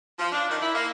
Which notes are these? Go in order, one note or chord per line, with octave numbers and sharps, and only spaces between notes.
F3
D4
D#3
E4
A#3